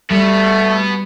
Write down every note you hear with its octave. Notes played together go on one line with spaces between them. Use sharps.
G3 A3 B3 F#4